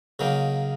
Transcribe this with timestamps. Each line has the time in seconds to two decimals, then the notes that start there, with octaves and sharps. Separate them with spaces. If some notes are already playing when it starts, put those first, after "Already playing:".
0.19 C#3 F#3 A#3 D#4